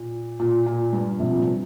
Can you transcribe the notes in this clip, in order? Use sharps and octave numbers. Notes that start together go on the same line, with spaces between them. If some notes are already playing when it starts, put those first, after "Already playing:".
Already playing: A#2
A#2
A#2
G2
C3 F3
A#2
G2